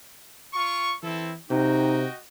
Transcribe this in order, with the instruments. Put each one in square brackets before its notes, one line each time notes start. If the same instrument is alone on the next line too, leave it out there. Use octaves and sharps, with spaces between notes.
[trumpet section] F4 C#6
[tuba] E3 [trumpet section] C4 E4 A4
[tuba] C3 [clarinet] D#4 [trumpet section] F#4 D#5 G5